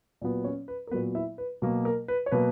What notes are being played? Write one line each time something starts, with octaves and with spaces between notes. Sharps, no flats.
A#2 F#3 B3
C#4 C#5
B4
A#4
A#2 F#3 B3 B4
E4 E5
B4
B2 F#3 A#3
A#4
B4
C#5
B2 F#3 A#3 B4